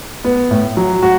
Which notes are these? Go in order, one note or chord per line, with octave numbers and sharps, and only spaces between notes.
B3
A2
F#3
F#4